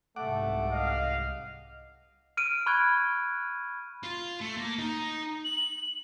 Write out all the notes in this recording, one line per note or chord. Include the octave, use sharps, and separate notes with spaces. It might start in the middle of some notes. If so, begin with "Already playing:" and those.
C2 G#2 A3 F#5 D6
D#5 F5
F6 D7 D#7
B5 C#6 F6 F#6 G#6
F4
A3
A#3
D#4
F#7